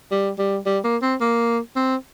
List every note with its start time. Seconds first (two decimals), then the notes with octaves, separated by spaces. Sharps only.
0.11 G3
0.38 G3
0.66 G3
0.84 A#3
1.02 C4
1.21 A#3
1.76 C4